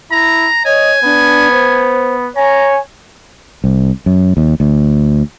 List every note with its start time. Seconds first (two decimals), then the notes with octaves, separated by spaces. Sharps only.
0.12 E4 A#5
0.65 C#5 D#5 G#5
1.04 B3 D4
1.51 C5
2.36 C#5 G#5 A#5
3.64 C2
4.06 F#2
4.37 D#2
4.60 D2